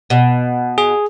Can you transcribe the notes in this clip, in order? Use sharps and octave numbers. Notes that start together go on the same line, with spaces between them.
B2
G#4